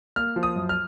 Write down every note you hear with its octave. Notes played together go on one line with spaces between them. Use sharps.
A#3 F6
F3
D#6
F#2
F6